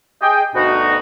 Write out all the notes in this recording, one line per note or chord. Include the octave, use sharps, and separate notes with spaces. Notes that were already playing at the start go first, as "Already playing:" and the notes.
G#4 D#5 G5
D2 B2 D#4 F#4